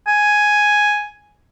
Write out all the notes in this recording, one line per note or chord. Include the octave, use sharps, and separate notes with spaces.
G#5